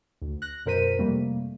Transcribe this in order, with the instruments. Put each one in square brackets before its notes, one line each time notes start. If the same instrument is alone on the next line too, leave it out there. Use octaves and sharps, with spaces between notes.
[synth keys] D2
F#6 A#6
F#2 B2 A#4 C5 B6 D#7
F2 C3 G3 A3 A#3